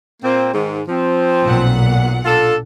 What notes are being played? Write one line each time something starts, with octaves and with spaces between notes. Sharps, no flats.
A#2 A#3 C4
G#2 D#3
F3 C4
B1 A#2 F#5
D4 F4 A4